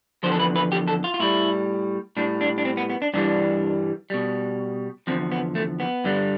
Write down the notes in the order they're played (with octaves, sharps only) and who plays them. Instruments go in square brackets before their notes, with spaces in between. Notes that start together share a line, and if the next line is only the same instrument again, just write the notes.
[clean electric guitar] E2 D3 F3 C5
A4
B4
B4
G4
A4
F4
F4
A2 G3 E4
A2 G3 D4
D4
D4
C4
B3
B3
D4
G2 E3 G3 D4
B2 G3
E2 D3 F3 C4
B3
A3
B3
G2 D3 G3